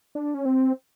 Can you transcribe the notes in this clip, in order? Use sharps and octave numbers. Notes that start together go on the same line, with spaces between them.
D4
C#4
C4